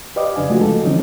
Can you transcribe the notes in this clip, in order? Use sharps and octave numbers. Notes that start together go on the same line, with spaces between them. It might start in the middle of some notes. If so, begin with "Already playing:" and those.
G4 B4 D5 D#5 F5 D6
F2 C#3 D4 G#5
F3 G#3 A3 F4 F#4
A4
D3 E3 F3 C4 C#4 D#4